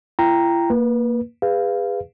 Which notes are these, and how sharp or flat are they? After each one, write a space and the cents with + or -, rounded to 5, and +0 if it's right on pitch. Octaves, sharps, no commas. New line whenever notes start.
E4 +45 G5 +0 A#5 +0
A#3 +0 B4 -25
G#4 -30 B4 +5 F5 -10